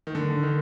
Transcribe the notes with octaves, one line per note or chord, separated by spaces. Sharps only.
D#3
D3
D#3